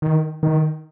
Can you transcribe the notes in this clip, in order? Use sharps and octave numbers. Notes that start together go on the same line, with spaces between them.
D#3
D#3